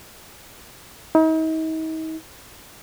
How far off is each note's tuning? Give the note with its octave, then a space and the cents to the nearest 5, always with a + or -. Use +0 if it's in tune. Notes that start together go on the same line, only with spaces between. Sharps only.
D#4 +40